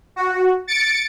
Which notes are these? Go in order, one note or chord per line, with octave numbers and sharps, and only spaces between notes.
F#4
A6 C#7 D7